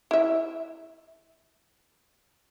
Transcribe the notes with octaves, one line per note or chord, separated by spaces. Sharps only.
E4 E5